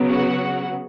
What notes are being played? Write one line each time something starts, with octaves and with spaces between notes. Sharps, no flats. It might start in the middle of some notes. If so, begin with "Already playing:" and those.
Already playing: C#3 F#3 B3
F#4 F#5